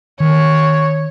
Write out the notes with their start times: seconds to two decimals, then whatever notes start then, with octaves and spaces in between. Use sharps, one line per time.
0.20 D#3 C#5